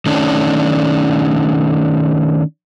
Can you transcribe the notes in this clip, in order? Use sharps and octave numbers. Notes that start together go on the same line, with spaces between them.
D#3 A3 C#4 D4